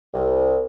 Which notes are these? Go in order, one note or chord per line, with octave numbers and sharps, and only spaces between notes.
C2